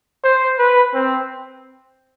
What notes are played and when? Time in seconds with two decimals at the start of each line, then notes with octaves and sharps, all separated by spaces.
0.24 C5
0.58 B4
0.94 C4